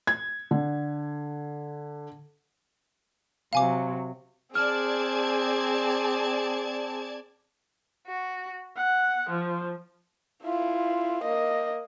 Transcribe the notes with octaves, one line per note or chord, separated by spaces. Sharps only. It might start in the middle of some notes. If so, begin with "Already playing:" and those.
G#6
D3
C3 F#3 F5 G#5 D6
C4 G#4 D5 A5 F6 G#6
F#4
F#5
F3
E4 F4
A#3 D#5